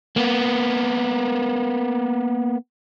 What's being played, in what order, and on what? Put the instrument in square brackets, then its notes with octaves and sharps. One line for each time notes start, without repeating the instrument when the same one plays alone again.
[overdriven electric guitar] A#3 B3